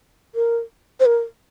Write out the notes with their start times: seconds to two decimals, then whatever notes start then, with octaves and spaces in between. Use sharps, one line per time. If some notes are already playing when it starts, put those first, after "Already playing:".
0.35 A#4
1.00 C5
1.06 A#4